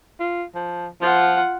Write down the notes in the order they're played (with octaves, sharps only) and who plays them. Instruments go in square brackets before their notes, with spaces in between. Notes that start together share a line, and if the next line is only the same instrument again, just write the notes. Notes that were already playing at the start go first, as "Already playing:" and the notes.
[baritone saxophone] F4
F3
[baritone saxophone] F3 [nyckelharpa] F4 F#5